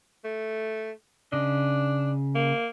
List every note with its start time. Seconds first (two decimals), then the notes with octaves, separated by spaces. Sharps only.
0.25 A3
1.32 C#3 D4 D#5
2.35 A#3